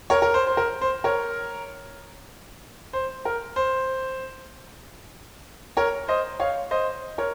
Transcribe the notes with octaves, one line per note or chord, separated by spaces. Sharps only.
A#4 C#5
A#4
C5
C5
A#4
C5
A#4 C#5
C5
A#4
C5
A#4 C#5
C5 D#5
C#5 F5
C5 D#5
A#4 C#5